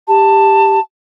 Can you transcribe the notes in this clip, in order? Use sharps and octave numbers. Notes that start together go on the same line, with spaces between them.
G4 A5